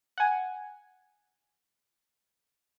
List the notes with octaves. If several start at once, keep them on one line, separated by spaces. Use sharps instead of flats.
F#5 G#5